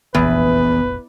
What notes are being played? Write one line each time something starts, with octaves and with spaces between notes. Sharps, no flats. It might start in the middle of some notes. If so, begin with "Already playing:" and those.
F1 A#1 E2 B3 B4